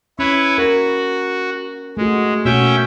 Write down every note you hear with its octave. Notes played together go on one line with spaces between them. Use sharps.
C#4 E4 B4 C#5
F#4 A#4
G#3 A3 F#4
B2 A#3 C#4 F#4 E5 G5